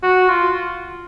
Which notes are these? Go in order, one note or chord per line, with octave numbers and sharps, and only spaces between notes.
F#4
F4